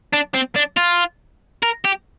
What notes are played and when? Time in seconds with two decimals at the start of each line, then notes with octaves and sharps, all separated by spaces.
0.13 D4
0.34 C4
0.56 D4
0.77 F4
1.63 A#4
1.85 G4